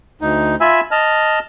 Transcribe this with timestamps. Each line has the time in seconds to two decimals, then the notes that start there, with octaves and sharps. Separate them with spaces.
0.21 D2 D#4
0.61 F4 E5 G#5 B5 E6
0.91 D#5 A5 F6